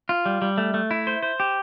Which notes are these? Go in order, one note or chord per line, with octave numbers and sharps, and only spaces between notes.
F4
G3
G3
A3
A3
E4
C5
C5
G4